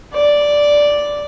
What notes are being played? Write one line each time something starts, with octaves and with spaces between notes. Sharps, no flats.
D5